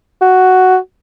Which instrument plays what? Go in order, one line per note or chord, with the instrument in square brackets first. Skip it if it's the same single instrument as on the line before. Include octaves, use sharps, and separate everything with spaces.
[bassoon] F#4